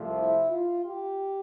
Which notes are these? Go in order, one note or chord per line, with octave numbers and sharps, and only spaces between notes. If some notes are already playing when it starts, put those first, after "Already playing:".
Already playing: C2 C3 F3 A3
E4
F4
G4